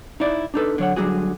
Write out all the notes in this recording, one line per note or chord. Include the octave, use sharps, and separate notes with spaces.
D#4 E4 D5
D4 D#4 A4 B4
D3 F#3 C#5 F#5
D3 F#3 G3 F#4 G#4